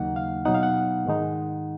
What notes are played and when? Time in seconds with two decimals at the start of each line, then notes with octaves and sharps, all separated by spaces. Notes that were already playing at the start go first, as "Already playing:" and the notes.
Already playing: D#2 C#3 F#3 A#3 D#4 F#5
0.16 F5
0.45 B2 F#3 B3 D#4 F#5
0.55 F5
0.63 F#5
1.06 G#2 D#3 G#3 D#4